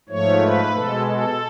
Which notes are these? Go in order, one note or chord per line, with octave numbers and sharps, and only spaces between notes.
G#2 F3 A3 C#5
B4
B2 G#3 A4
A4